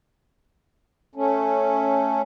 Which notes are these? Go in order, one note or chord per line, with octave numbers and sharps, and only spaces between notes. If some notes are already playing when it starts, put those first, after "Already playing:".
A3 C#4